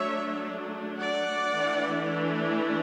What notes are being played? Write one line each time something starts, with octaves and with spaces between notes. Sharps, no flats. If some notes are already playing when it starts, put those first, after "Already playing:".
Already playing: F#3 A3 D4 C#5 E5
D5 F#5
E3 A3 D4